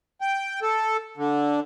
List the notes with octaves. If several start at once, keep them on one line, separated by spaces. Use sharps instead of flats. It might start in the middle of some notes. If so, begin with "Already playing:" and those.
G5
A4
D3